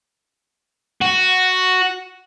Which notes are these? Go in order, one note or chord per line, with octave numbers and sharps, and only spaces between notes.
F#4